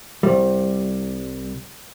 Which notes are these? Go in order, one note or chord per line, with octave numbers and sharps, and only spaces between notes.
C2 G3